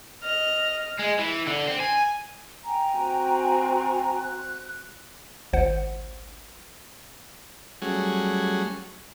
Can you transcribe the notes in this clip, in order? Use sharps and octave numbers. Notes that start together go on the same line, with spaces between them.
D#5 F6
G#3
E3
D3
C4
G#5
G5 G#5 A#5
C4 F#4
F#6
G#1 C#2 C5 F#5
F#3 G3 A3 C#4 F#4 G#4